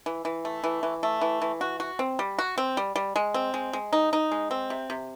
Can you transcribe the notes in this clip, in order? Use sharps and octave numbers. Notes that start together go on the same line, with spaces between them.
E3
E3
A3
E3
E3
A3
E3
E3
F#4
F#4
C4
G3
F#4
C4
G3
G3
G#3
C4
G#3
G#3
D#4
D#4
G#3
C4
C3
C3